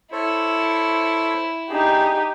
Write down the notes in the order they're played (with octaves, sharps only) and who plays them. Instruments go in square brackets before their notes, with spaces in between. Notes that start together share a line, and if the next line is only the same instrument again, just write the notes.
[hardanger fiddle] E4 [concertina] A4 C5 C#5
[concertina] D4 G#4 [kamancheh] D#4 G4